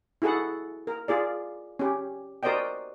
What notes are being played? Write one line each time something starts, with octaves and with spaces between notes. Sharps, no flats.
E4 F#4 G#4 A4 F#5
A#4
F4 G#4 D5
C#4 G4
F#4 A#4 C5 D5 D#5 G5